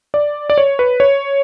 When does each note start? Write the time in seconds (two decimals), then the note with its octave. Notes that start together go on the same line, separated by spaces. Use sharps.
0.14 D5
0.50 D5
0.58 C#5
0.79 B4
1.00 C#5